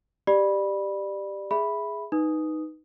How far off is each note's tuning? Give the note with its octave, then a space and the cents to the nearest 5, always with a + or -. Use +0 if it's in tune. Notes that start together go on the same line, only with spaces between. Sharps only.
G4 +0 D5 +20 B5 -15
G#4 +0 E5 +0 B5 +0
D#4 +0 B4 +0 D#6 +0